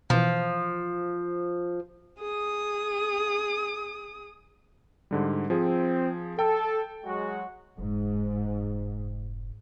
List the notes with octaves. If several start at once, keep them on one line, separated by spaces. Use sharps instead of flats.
B2 E3 F3
G#4 D#6
G#2 D3 G3
F3 C4 G#4
A4 G5
F#3 G#3 F#4
F1 G#2